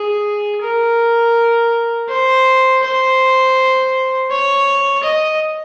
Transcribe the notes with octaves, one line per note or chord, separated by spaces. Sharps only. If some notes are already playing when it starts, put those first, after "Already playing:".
Already playing: G#4
A#4
C5
C5
C#5
D#5